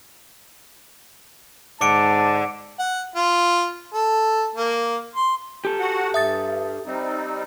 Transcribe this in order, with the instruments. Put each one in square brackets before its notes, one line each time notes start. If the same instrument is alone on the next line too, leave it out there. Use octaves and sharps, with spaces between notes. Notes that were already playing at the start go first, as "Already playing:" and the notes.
[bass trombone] G#2 [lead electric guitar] D5 F#5 [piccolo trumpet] A5 [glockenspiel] D6 C#7 D7
[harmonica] F#5
F4
A4
A#3
C6
[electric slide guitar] G4 A4
[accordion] F#4 F#5
[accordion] G2 [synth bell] E5 D#6 A6
[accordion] G3 C4 D#4